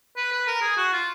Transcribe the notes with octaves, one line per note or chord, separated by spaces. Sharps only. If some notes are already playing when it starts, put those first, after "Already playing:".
B4
B4
A#4
G#4
F#4
F4